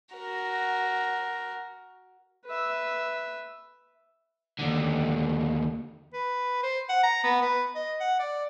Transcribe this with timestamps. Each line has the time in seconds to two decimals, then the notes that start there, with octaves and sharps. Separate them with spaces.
0.14 F#4 A#4
2.46 B4 E5
4.59 D#2 D3
6.13 B4
6.63 C5
6.89 F#5
7.03 A#5
7.24 B3
7.42 B4
7.75 D#5
8.00 F#5
8.19 D5